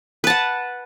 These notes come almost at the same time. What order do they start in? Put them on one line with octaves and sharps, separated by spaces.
B4 A5 F#5